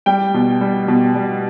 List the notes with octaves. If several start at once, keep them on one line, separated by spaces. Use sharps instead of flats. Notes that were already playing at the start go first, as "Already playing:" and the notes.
G3 G5
B2
G3
B2
G3